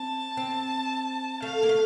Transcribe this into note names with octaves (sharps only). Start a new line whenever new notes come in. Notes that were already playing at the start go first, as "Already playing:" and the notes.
Already playing: C4 A5
C4
A3 F5
A#3
A3